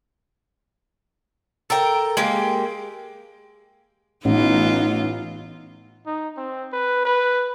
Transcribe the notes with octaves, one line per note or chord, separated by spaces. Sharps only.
A4 A#4 G5
G#3 A#3 G4
A1 E3 B3 D#4 F4
D#4
C4
B4
B4